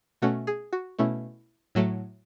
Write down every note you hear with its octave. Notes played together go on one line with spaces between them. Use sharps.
B2 A3 C#4 F#4
G#4
F#4
B2 A3 C#4 E4
A2 F#3 A3